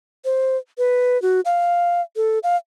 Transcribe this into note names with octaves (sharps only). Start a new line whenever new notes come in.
C5
B4
F#4
F5
A4
F5